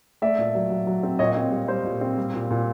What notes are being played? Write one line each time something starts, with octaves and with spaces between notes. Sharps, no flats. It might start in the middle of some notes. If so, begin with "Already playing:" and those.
A3 D5 E5
A#2
F#3
F#3
F#3
C4
A#2 C#5 D#5
C4
G3
G3 C5
A#2
C4
G3
A#2
A#2